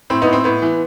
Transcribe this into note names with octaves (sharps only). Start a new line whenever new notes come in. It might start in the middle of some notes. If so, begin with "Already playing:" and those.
A2 C4
B3 D#4
A2
C4
A2 B3
E3